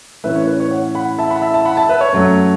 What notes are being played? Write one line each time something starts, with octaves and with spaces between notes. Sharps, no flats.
A2 E3 C#4 B4 E5
C#5
B4
C#5
C#5 F#5
F#5 B5
E5 A5
F#5 B5
E5 A5
E5 A5
F#5 B5
E5 A5
B4 E5
C#5
F#2 F#3 A3 C#4